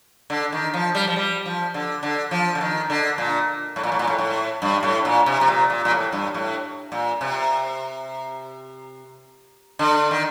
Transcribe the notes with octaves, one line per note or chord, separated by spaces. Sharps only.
D3
D#3
F3
G3
F3
G3
F3
D3
D3
F3
D3
D#3
D3
A#2
A2
A#2
A2
A#2
A2
A2
G2
A2
A#2
C3
C3
A#2
A#2
A#2
A2
G2
A2
A#2
C3
D3
D#3